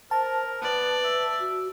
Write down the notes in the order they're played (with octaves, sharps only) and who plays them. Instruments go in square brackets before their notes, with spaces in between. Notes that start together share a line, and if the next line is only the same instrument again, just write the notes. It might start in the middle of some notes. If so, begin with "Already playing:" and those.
[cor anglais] A#4 [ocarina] C5 [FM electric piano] A5
[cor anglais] B3 [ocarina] B4 [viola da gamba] D5
[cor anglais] E5
[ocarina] F#4